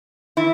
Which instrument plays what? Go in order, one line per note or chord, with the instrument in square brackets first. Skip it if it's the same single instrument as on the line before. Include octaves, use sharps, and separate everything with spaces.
[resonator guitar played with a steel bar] E3 E4